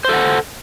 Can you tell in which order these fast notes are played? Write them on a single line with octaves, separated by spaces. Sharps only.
C5 A4 F#5